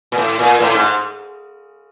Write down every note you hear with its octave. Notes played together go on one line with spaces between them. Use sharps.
A#2
A2
A#2
A2
G#2